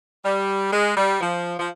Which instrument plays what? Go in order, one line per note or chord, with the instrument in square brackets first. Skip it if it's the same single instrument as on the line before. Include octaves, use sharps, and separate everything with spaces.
[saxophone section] G3
G#3
G3
F3
F3